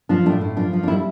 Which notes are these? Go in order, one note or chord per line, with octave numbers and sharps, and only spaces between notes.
F3 D4
A2 D4
A2
F3 D4
F3
D4
G3 E4